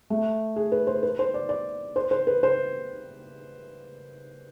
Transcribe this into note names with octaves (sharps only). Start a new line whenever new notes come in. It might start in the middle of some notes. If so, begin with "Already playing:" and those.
A3
G#4
B4
C5
B4
C5
D5
D5
C5
C5
B4
C5